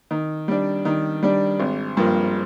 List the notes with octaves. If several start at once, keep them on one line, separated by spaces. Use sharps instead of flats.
D#3
G3 D4
D#3
G3 D4
G#1
G2 F3 A#3